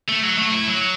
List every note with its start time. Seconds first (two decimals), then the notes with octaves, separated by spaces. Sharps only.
0.09 A3
0.23 F#3
0.38 A3
0.52 E4
0.66 F#3